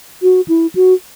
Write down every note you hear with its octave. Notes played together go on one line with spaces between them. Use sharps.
F#4
E4
F#4